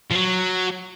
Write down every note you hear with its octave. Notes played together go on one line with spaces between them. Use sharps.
F3
F#3